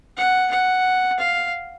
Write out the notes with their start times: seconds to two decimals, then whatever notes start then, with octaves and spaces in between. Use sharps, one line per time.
0.17 F#5
0.51 F#5
1.19 F5